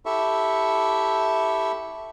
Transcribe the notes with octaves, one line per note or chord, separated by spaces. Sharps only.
E4 G4 A4 E5 C#6